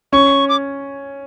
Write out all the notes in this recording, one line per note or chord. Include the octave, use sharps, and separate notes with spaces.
C#4 C#6
D6